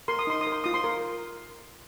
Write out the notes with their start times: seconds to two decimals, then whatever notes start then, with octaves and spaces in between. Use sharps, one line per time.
0.08 A#4 C6
0.19 D#6
0.27 D#4 C6
0.41 D#6
0.47 A#4
0.52 C6
0.64 F4 D#6
0.74 C6
0.84 A#4